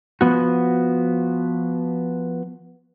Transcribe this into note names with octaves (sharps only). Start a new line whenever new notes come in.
F3 B3 F#4